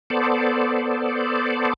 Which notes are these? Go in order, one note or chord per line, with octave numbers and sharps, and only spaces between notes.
B3 A4 C5 D5